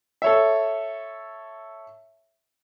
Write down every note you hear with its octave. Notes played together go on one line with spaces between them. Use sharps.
A4 C#5 E5